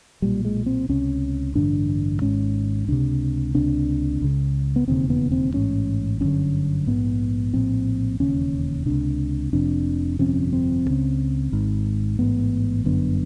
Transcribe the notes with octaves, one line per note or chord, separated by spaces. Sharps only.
B1 A#2 G3
G#3
C4
C#2 C3 C#4
A1 G2 D3 D4
G#1 G#2 C#4
C#2 C3 D4
C#2 C3 D4
C#2 C#3
B3
E1 D#2 C#3 C4
B3
C4
A1 G#2 C#4
G1 F#2 D3 C#4
A#1 G#2 B3
A#1 A2 C4
E1 D#2 C#3 C#4
C#2 C3 D4
F1 F2 C3 D4
G1 F2 C3 C#4
C4
C#2 C#3
G#1 G#2
A1 G#2 B3
G1 F#2 D3 B3